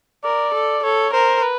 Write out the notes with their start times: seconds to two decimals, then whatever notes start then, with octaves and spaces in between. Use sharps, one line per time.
0.24 A#4 D5
0.54 A4
0.84 A4 C#5
1.13 A#4 C5
1.42 B4